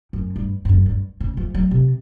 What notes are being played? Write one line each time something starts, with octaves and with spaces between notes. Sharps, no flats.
F#2
G2
G2
F#2
G2
C#3
F3
F#3
C3